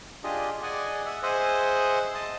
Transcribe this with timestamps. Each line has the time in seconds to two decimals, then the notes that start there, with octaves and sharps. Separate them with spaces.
0.24 D4 F4 G4 G#4 D#5
0.63 G#4 D5 D#5 F#5 G#5
1.06 E5 F#5
1.23 G#4 C5 D#5 E5 F#5
2.15 D#5 A5